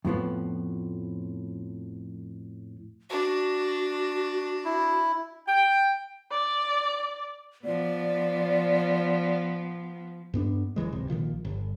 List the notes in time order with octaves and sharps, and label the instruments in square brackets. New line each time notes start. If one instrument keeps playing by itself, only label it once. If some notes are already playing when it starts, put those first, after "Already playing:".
[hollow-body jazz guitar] F2 A2 F3 B3
[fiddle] D4 [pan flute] F#4
[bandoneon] E4
[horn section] G5
[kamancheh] D5
[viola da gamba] F3 B3 [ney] D5
[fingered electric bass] G2 B3 D4
F1 E2 E3 G#3
D1 C3
A#1 D#3 F3
G1